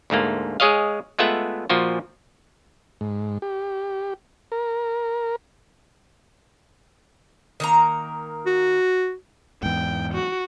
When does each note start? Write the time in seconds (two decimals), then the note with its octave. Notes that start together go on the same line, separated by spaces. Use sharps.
0.10 D2 G#2 A3 A#3
0.60 G#3 G#4 C#5 D#5 F5
1.19 G#3 A3 B3 F4 E5 F#5
1.70 A#2 F3 F4 F#4
3.01 G#2
3.42 G4
4.52 A#4
7.60 D#3 A#3 A#5
8.46 F#4
9.63 E2 G#2 G5
10.14 F#4